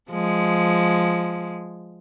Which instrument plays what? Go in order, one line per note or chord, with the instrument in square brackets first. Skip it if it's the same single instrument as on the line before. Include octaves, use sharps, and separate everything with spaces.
[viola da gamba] F3 G#3